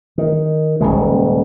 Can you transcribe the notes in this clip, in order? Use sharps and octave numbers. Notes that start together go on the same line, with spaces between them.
D#3
D#1 C2 C#3 G#3